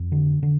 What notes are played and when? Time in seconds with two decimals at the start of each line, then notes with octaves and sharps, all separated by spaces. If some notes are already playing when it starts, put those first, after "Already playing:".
Already playing: F2
0.12 D3
0.43 D3